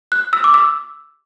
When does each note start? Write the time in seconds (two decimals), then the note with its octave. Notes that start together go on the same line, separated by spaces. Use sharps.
0.12 F#6
0.33 E6
0.44 D6
0.54 E6